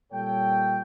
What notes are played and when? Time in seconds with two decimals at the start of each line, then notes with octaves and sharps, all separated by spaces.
0.13 A#2 G3 A4 C#5 G5